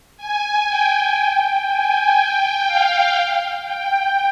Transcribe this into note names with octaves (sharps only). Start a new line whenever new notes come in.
G#5
G5
G#5
G5
F5
G5